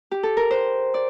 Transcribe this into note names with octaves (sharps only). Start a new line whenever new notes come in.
G4
A4
A#4
C5
D5